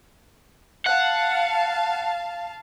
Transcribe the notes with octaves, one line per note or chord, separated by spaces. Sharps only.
F5 F#5 A5